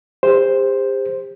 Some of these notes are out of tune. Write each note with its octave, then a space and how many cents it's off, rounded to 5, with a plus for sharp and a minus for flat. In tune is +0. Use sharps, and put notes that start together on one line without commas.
G4 +40 C5 +0